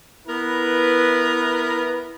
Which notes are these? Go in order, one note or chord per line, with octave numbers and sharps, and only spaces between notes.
B3 E4 A#4 B4